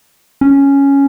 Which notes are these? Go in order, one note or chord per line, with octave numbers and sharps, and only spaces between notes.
C#4